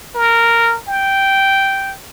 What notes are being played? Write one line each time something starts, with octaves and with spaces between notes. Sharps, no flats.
A#4
G5